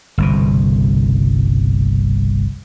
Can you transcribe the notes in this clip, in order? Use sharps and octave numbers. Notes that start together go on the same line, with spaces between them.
G1 C2 B2